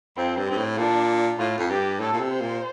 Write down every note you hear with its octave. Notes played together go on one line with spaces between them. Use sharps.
F2 C4
G2
G2 C4
A2
A#2 D4
A2 F4
F2
G2 G4
A2 A4
A#2
C3
C5
A#2